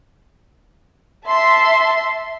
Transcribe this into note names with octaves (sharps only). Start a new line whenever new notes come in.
E5 A5 C6